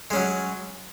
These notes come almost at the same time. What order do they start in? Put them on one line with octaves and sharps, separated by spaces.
G#3 C#4 F#3